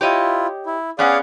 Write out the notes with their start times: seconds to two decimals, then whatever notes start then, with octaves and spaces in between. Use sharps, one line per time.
0.01 E4 F4 G4 C#5 D#5
0.66 E4
0.99 B3 C#4 G#4 D5 F5 F#5